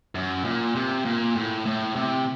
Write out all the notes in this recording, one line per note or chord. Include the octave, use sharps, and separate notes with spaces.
F#2
A#2
C3
A#2
A2
A2
C3